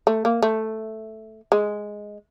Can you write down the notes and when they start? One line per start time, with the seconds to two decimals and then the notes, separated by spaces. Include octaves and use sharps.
0.07 A3
0.25 A#3
0.42 A3
1.52 G#3